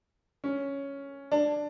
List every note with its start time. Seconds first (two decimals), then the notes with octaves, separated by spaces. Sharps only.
0.44 C#4
1.32 D4